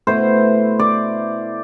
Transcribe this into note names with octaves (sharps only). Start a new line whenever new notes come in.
B2 A3 E4 C5
D5